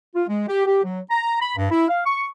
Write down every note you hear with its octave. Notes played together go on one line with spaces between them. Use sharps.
F4
G#3
G4
G4
F#3
A#5
B5
G2
E4
F5
C#6